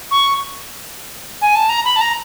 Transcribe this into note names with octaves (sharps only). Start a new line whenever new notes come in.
C#6
G#5
A5
A#5
B5
A5
A#5